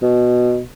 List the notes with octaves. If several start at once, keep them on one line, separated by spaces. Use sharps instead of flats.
B2